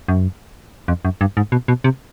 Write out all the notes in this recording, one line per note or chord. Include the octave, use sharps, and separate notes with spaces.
F#2
F2
F#2
G2
G#2
B2
B2
C3